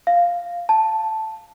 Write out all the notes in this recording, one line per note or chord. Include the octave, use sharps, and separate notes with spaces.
F5
A5